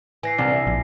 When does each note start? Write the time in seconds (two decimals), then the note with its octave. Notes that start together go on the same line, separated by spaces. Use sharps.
0.23 E3 G#5 A#6 C7
0.38 C2 D4
0.53 E4
0.67 A#1